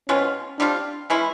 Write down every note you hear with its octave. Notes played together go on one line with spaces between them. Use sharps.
B2 G#3 C4 C#4 F4
G3 C4 D4 F4
E3 G#3 C#4 E4